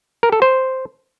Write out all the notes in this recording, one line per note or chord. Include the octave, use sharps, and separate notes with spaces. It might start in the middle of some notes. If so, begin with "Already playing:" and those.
A#4
A4
C5